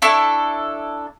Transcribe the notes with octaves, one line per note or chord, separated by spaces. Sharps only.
D4 E4 A4 C#6